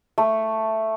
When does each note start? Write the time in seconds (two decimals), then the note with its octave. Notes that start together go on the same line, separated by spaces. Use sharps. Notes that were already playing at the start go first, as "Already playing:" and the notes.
0.18 A3